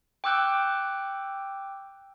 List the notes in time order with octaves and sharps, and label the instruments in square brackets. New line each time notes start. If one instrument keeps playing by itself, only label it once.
[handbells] G5 C#6 D6 E6 F#6 G6